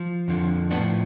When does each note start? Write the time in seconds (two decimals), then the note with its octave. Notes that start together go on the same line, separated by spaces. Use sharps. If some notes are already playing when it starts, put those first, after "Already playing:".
Already playing: F3
0.28 F2 D3 F3
0.71 A2 B3 D4
0.74 F3